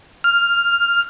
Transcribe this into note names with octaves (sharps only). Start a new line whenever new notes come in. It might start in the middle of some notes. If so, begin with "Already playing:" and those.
F6